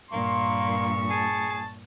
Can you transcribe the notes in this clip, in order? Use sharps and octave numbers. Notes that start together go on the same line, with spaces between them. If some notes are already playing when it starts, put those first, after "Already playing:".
G2 A#2 A#3 C6 C#6
G#4 A5